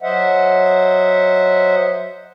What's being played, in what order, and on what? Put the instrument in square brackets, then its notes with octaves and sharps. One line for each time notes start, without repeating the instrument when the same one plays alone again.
[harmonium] F#3 C5 D#5 E5 F#5